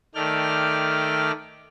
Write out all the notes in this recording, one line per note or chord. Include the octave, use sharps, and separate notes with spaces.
D#3 A3 D5 G5 F6